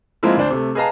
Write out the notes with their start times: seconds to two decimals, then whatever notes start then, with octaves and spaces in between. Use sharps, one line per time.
0.23 F3 G#3 A#3 C4 E4 F4
0.37 D2 D4 C5
0.51 C3 A3
0.75 G#4 B4 D#5 F5 A5 A#5